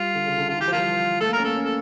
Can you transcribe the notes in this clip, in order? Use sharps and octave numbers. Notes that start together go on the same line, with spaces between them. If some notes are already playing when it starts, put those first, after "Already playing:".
Already playing: G3 F4
D3
C#3
D3
D3 F4
E3
G4
F3
G3 A#3 F4
A3 A4
A#3
C#4 A#4
A#3 A4
C#4
A4